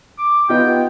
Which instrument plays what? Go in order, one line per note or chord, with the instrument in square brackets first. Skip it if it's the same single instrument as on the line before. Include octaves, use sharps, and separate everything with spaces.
[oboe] D6
[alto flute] B3 [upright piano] D#4 F4 G4 [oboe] G5